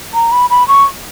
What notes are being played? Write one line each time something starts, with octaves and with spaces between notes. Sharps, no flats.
A#5
B5
B5
C#6